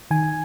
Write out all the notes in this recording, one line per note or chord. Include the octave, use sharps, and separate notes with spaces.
D#3 G#5